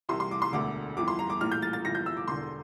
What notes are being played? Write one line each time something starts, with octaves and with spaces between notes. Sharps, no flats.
C2 C3 E3 C6
C6
D6
C6
E1 D2 D3 D6
G1 F2 E3 D6
C6
A#5
D6
A#1 A2 E3 F6
G6
A6
A6
G1 F2 E3 A#6
G6
E6
D6
E1 E2 D3 C6